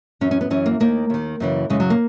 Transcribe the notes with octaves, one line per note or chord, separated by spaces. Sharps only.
F#2 E3 C#4
C#4
B3
F#2 E3 C#4
A#3
D#2 D#3 A#3
D#2 D#3
F#2 C#3 E3
F#2 C#3 E3 G#3
F#3
A#3